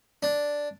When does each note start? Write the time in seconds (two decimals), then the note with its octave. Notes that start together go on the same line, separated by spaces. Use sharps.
0.23 D4